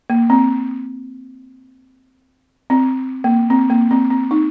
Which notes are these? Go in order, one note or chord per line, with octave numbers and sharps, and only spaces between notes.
A#3
C4
C4
A#3
C4
A#3
C4
C4
D#4